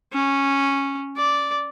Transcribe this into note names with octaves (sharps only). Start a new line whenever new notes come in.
C#4
D5